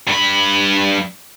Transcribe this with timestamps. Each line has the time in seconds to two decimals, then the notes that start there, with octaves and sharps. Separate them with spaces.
0.07 G2 B5